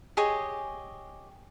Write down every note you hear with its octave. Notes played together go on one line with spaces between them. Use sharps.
G4 G#4 C#5 D#5